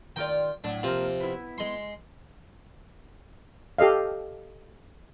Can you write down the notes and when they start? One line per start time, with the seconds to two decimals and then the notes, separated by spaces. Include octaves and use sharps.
0.16 D#3 F4 D5 G5
0.64 A2 F#3 D4
0.83 C3 F3 A#3 C5
1.20 B3 E4
1.58 G#3 C6
3.78 G4 A4 D#5 F5